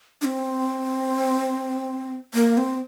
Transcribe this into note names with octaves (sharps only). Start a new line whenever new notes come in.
D4
C4
A#3
C4